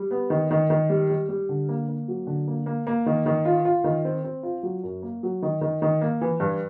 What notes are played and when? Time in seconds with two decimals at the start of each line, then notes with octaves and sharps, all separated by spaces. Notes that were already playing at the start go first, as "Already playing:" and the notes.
Already playing: G3
0.11 B3
0.30 D#3
0.51 D#3
0.70 D#3
0.89 G3
1.10 G3
1.29 G3
1.49 D3
1.69 A#3
1.88 A#3
2.08 F#3
2.27 D3
2.48 A#3
2.66 A#3
2.87 A#3
3.06 D#3
3.26 D#3
3.45 F4
3.65 F4
3.84 D#3
4.05 C4
4.24 C4
4.43 F4
4.63 F#3
4.83 F#2
5.02 A#3
5.23 F#3
5.42 D#3
5.61 D#3
5.82 D#3
6.01 A#3
6.21 E3
6.40 G2